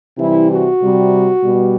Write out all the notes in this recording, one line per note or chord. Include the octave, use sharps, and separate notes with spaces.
C3 E3 G3 E4
F#4
C3 G3
B2 G3